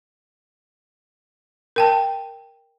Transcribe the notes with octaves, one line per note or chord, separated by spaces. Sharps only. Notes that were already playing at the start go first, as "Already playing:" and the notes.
A#4 G5 A5